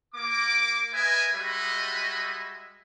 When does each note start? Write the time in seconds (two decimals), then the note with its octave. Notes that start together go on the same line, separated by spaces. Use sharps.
0.15 A#3 D6
0.93 A#4 B4 D#5 E5 G#5
1.33 G3 G#3 F#4 D#5 E5 B5